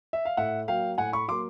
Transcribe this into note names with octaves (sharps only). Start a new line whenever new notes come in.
E5
F5
A2 E5 F#5
F#3 A#3 F5 G5
A2 F#5 G#5
B5 C#6
F#3 A#3 C6 D6